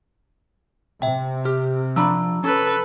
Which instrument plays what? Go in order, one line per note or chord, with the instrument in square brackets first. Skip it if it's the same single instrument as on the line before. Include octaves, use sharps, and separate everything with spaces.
[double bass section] C3 [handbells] E5 G5
[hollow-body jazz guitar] G4 [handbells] F6
[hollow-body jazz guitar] F3 D4 B5 [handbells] A#5 E6
[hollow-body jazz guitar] C#4 [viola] A4 B4